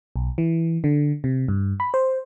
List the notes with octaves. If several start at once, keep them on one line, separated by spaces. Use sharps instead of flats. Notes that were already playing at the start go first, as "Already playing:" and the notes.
B1
E3
D3
C3
G2
B5
C5